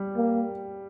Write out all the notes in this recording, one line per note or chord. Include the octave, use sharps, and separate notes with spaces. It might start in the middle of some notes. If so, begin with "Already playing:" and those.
Already playing: G3
A#3